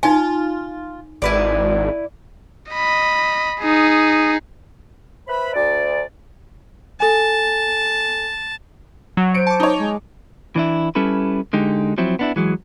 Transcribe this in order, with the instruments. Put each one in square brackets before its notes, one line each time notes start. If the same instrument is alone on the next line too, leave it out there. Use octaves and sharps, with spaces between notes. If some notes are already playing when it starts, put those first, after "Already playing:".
[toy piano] D#4 G#5 [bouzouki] F4
[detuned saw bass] G#1 [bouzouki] E4 B4 D5
[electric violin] D#5 B5
D#4 G#4
[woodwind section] B4 C5 E5 B5
D2 D5
[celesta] A4 G#5 [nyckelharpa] A5
[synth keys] F#3 [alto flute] F#5
[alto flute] C5 [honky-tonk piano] C#7 D7
[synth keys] A5 D6
[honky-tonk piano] D#4 C#5
[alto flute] G#3
[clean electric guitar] E3 D4 E4
G3 C#4 E4 A4 B4
D3 G#3 D#4 G4
F3 F#3 C4 E4
B3 D4 E4
E3 F#3 G#3